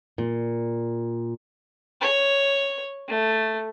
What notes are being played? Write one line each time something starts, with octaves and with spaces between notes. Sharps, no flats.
A#2
C#5
A3